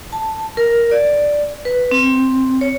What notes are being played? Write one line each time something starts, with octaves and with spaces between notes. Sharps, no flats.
A5
A#4
D5
B4
C4
C#5